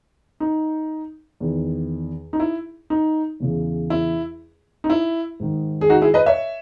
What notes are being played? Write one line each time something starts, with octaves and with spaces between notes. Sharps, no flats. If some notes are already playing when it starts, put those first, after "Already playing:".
D#4
E2 D#3
D#4
E4
D#4
E2 C#3 E3
E4
D#4
E4
G#2 D#3
G#4
D#4 F#4
E4 G#4
B4 D#5
C#5 E5